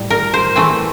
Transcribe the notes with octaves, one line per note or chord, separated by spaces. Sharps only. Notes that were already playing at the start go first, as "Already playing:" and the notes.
Already playing: A2 G3
A#4
C5
E3 A3 C4